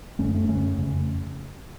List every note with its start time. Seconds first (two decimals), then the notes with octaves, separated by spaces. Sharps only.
0.19 F#2 D3 A3 C#4
0.34 A3 C#4
0.48 F#2 D3 A3 C#4
0.78 F2 C#3